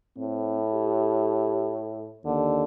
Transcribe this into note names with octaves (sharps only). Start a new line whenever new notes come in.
A2 C4
G4
D#2 D3